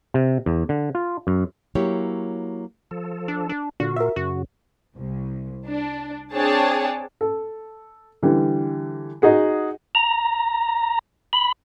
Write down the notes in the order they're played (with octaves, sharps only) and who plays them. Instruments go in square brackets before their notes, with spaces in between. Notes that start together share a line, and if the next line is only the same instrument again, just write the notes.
[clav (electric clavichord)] C3
E2
D3
F4
F#2
[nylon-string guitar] F#3 A#3 E4 G4 C#5
[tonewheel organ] F3 A4
[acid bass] D4
D4
[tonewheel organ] A#2 F4 [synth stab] D3 [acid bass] F#4
[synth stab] A#4 E5
[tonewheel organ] F#2 C#3 [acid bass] F#4
[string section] C2
D4
C4 D4 G#4 C#5 G5 A5
[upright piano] A4
D3 E3 G3
D#4 F#4 G#4 F#5
[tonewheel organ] A#5
B5